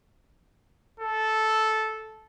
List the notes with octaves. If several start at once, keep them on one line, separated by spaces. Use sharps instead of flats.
A4